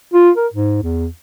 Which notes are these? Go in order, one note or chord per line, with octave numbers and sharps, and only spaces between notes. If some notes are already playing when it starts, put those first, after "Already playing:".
F4
A#4
G#2
E2